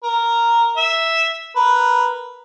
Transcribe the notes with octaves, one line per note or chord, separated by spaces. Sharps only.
A#4
E5
A#4 B4